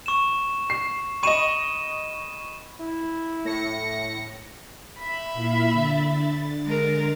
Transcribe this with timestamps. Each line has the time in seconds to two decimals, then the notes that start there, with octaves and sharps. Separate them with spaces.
0.06 C#6 E7
0.70 C7
1.23 D#5 B5 C#6 D#7 E7
2.80 E4
3.45 A2 A#6 C#7
4.99 E5 B5
5.33 A#2 E4 F5
5.72 D3 A6
6.64 G#3 A#4